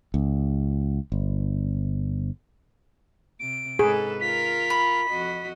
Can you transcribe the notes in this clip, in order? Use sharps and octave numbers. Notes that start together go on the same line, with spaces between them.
C#2
G1
C3 D7
G#2 G#4 A4 B4
F4 A#4 B6
B5
F2 F#4 D#5